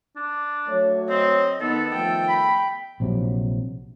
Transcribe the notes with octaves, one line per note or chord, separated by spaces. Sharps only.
D4
F#3 A3 C#5
C4 D#5
D#3 B3 A4 D#5
D#3 F3 A3 G5
B5
A#1 C3 F#3